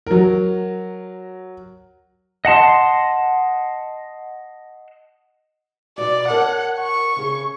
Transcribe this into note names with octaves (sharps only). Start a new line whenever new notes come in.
F#3 A#4
D#5 F#5 A5 C6
B2 F#4 D5
A#4 C#5 F#5 A5
C#6
C#3 G#4